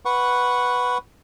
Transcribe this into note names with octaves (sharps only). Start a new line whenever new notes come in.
B4 F#5 C#6